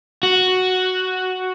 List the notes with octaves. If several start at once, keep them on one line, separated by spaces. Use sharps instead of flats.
F#4